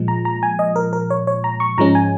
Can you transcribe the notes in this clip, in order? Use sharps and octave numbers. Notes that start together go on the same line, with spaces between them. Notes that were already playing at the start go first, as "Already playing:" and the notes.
Already playing: A#2 F3 G#3
A#5
A#5
G#5
D#5
A#4
A#4
C#5
C#5
A#5
C#6
G#2 F3 G#3 C#4 A#5
G#5